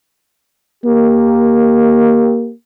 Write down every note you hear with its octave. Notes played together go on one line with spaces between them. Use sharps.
A#3 G4